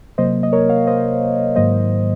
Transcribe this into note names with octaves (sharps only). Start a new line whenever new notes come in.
C3 F#3 A#3 C5 D#5
D#5
A#4 C#5
C#5 F5
C5 D#5
G#2 D#3 F#3 A#3 C5 D#5